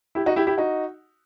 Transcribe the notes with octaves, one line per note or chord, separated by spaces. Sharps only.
E4 G4
D#4 F#4
E4 G4
E4 G4
D#4 F#4